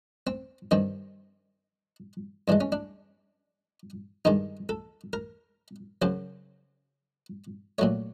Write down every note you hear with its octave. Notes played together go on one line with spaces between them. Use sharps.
C4
G2 D#3 G3 C4
G2 E3 G#3 D4
C#4
D4
G2 D#3 G#3 D#4
A4
A#4
F#2 C#3 F#3 C5
A#2 F#3 A3 C#5